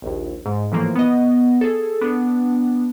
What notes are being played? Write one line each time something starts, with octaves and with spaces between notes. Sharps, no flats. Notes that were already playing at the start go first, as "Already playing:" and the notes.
A#1 D#2
G#2
A2 E3 F3 A#3
B3 D#5
G#4 A4
B3 D4